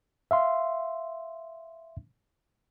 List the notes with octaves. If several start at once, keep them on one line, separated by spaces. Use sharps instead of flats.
E5 F5 C6